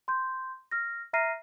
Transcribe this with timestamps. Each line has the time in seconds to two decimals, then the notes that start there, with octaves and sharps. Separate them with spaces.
0.08 C6 G6
0.71 F6 A#6
1.13 E5 A#5 F6 A#6 C7 D#7